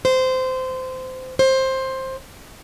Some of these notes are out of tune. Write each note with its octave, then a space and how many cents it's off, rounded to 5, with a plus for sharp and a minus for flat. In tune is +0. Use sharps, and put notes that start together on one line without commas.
C5 -20
C5 +15